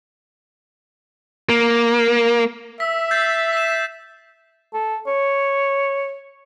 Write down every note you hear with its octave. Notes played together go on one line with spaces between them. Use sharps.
A#3
E5 E6 B6
G6 A6 C7
B6 E7
A4
C#5